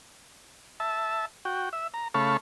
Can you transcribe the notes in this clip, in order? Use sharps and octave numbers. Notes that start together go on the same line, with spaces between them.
E5 A5
F#4 G5
E5
A#5
C#3 A3 F5 A5 B5 C#6